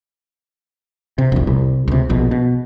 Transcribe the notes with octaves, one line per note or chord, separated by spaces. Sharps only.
C3
E1 A#1
C2
C#2 C3
A#1 B2
B2